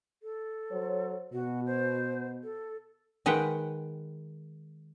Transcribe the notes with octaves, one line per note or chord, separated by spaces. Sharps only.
A4
F#3 C5 C#5
B2 F#4
C5
A4
D#3 G#3 B4 F#5 G5